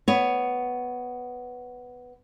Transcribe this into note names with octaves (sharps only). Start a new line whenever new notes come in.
B3 C#5